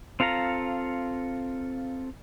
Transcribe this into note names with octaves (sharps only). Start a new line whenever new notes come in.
C4 F4 A4 F5 A#5